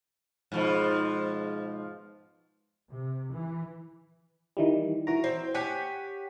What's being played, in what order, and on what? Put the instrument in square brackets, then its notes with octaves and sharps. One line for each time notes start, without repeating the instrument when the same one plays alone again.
[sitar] G#2 B2 F3
[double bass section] C3
E3
[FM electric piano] D#3 E3 G3
[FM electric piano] E3 F#4 A#5 [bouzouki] A#4
[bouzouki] C4
[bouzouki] G4 G#5 [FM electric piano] C#5 F#5 B6